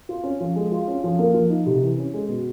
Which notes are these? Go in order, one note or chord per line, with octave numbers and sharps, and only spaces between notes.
F4
C#4
F3
G#3
F4
C#4
F3
A#3
F3
D#4
C3
E3
C#4
G#3
B2